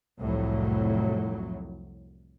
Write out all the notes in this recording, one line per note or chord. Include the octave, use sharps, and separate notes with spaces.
C2 F2 A2 F#3